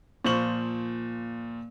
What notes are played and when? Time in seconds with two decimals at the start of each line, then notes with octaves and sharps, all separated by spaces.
0.25 A#2 F3 C5 C#6 F#7